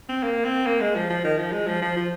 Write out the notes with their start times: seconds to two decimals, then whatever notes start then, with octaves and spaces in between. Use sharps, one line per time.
0.09 C4
0.23 A#3
0.45 C4
0.66 A#3
0.81 G#3
0.96 F3
1.10 F3
1.24 D#3
1.38 F3
1.52 G#3
1.67 F3
1.82 F3
1.96 F3